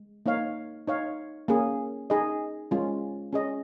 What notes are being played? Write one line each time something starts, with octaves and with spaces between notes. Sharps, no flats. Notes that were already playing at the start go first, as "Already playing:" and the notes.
Already playing: G#3
A#3 D#4 C#5 F5
D#4 C#5 F5
A#3 C#4 G#4
D#4 G#4 D#5
G#3 C#4 F4
C#4 G#4 D#5